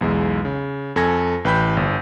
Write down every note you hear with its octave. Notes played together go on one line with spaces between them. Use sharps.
B1 E2 G#3
C#3
F2 A4 G#5 G#6 A#6
A1 B4 G5 B5 G6 B6
G1